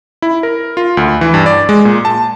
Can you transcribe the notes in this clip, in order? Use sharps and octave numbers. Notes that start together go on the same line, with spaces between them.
E4
A#4
F4
D2
E3
G2
D5
G#3
A#2
A5